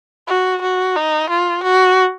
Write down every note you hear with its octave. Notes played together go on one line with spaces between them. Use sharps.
F#4
F#4
D#4
F4
F#4